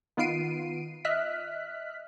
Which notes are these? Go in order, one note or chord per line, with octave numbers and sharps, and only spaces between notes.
D#3 B3 F4 C7 D7 D#7
D#5 E5 F6 F#6 B6